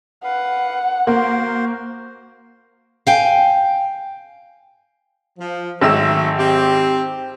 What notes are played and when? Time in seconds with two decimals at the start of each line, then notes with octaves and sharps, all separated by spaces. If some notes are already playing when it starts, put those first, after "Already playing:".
0.24 B4 F5 F#5
1.07 A#3 F#4 A#4 C5 C6
3.07 F5 G5 G#5
5.38 F3
5.81 G#1 F#3 A3 E6
6.37 C4 G4